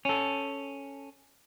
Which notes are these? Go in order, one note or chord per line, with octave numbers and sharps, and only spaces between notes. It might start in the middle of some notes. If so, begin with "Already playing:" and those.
C#4 A4